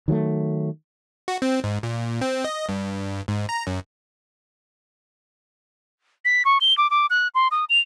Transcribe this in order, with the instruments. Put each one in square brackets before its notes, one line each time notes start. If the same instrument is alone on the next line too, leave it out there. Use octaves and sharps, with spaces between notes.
[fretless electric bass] D#3 F#3 G#3 A3
[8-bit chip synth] F#4
C4
G#2
A#2
C4
D#5
G2
G#2
A#5
F#2
[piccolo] B6
C#6
G7
D6
D6
F#6
C6
D#6
F7